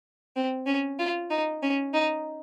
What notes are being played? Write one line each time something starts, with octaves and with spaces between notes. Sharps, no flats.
C4
C#4
F4
D#4
C#4
D#4